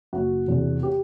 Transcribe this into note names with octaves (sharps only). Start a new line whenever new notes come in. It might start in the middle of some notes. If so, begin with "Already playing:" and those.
F#1 F#4
E2 C3
G4